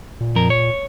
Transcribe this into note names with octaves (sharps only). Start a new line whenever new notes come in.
A#2
F2 A#4
C#5